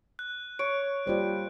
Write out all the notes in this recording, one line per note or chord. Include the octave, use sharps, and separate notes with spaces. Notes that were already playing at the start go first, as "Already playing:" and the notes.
F#6
C#5 D7
G3 A#3 F4 C5